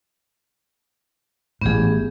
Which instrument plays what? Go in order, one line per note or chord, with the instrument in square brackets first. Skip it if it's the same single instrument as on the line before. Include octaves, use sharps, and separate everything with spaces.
[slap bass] A1 G#2 [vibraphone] B3 G4 G#4